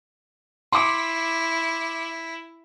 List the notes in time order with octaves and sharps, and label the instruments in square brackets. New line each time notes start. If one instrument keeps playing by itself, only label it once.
[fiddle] E4 [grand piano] C6 D6